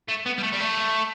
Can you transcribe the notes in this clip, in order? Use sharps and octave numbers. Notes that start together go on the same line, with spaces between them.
A3
B3
G3
A3
G3
A3